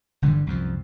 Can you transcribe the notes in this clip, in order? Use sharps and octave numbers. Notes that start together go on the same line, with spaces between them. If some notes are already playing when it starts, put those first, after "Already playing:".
G1 D3 E3 G3
C2 F#2 F3